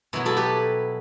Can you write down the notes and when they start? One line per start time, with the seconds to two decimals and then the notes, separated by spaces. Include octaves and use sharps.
0.13 B2 F#3 B3 E4
0.25 F#4 A4
0.37 G4 B4